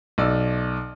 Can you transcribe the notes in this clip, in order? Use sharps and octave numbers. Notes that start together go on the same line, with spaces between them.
B1 D5 E6